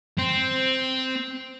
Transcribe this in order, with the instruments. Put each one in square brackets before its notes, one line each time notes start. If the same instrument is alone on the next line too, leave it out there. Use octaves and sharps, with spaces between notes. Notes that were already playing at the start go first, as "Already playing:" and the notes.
[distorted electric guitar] C4